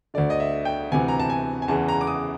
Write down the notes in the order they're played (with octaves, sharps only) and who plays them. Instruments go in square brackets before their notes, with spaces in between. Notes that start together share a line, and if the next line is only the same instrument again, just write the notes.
[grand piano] D2 D3 D5
D#5
E5
G5
D2 C3 E3 G#5
A#5
A5
G#5
G#5
E2 C#3 E3 A5
A#5
D6
D#6